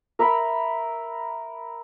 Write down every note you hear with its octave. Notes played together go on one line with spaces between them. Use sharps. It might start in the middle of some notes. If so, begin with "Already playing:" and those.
A#4 E5 A#5 B5